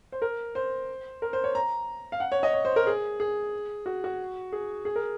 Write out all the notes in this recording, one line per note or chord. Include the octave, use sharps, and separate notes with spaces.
C5
A#4
C5
A#4
C5
C#5
A#5
F5
F#5
C#5
D#5
C#5
C5
A#4
G#4
G#4
F#4
F#4
G#4
G#4
A#4